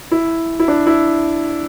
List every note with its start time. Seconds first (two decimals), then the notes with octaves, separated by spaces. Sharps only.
0.12 E4
0.60 E4
0.68 D4
0.86 E4